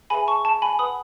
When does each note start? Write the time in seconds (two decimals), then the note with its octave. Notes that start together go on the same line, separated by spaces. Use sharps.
0.10 G#4 B4 E5 G#5 B5
0.27 A5 C#6
0.45 A5
0.62 G#5 B5
0.79 B4 F#5 B5 D#6